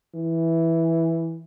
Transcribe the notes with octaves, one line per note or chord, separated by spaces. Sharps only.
E3